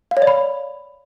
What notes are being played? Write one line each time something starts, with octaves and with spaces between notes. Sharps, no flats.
F5
C#5
D5
B5